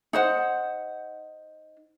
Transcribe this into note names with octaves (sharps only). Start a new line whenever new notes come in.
D#4 C5 F#5